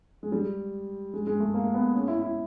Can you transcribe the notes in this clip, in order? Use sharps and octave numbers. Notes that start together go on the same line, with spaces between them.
G#3
G3
G#3
G#3
A3
A#3
B3
C#4
E4
E4